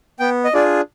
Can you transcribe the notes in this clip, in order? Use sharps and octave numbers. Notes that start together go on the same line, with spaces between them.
B3 G5
D#5
D4 F4 G#4 D5